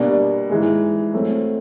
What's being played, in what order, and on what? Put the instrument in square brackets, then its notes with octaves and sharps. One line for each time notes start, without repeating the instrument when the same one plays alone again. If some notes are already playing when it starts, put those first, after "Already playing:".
Already playing: [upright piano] B2 G3 A#3 D4
G#2 E3 G#3
F#3 A3 C4